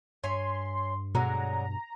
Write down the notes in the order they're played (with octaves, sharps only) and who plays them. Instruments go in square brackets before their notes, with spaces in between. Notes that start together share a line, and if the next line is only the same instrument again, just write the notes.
[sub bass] G2 [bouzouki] C#5 E5 G#5 [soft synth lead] C6
[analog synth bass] B2 [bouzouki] D3 F#3 G#3 [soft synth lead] A#5